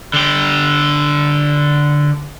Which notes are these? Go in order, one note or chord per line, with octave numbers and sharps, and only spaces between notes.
D3 G4